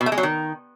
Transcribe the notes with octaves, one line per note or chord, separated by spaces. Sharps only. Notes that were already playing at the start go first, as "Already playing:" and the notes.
B2
A3
G#3
F#3
D#3